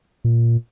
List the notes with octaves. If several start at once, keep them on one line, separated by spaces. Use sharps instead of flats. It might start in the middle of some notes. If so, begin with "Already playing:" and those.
A#2